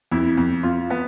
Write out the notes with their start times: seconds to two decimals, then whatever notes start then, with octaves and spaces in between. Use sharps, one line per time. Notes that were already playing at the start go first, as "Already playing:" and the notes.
0.12 F2 E4
0.37 F2
0.63 F2 F4
0.90 B3